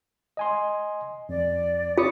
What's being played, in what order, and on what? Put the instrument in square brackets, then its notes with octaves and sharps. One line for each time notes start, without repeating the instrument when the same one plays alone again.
[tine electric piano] D#5 G#5 C6
[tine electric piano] F2 [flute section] D5
[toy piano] F4 [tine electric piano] C#5 D#6 C#7 [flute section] D6